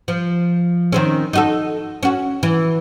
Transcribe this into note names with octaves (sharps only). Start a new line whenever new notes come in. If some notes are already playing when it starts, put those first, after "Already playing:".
F3
D#3 C4 C#4
D#4 F#4 A4
C#4 F#4
E3